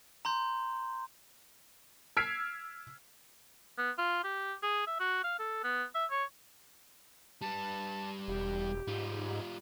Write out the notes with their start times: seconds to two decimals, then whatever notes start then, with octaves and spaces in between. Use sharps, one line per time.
0.25 A#5 C6 G6
2.17 E6 F6 G#6 B6 C7 D7
3.78 B3
3.98 F4
4.24 G4
4.63 G#4
4.87 E5
5.00 F#4
5.24 F5
5.39 A4
5.64 B3
5.95 E5
6.11 C#5
7.42 G3 B4 A5
8.28 E1 G4
8.87 G#2 G3 F4